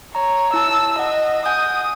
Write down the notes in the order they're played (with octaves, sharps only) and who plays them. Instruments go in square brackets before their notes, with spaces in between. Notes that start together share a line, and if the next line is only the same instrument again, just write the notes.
[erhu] C#5 [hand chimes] A#5
[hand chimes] E4 A5 [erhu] E6
[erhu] D#5 [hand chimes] F#5
[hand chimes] F#5 G#5 G6 [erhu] D#6